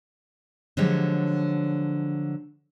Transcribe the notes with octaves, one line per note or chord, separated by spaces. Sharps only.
D3 F3 F#3 G#3 G4 C#5